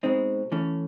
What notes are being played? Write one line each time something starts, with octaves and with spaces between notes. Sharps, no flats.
B2 G#3 C4 D#4
E3 A3 C#4